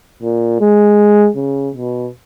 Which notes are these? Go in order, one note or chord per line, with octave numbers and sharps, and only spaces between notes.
A#2
G#3
C#3
B2